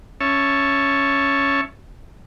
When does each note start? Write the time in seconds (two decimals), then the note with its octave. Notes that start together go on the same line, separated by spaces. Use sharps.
0.21 C#4 C#5 E5 A5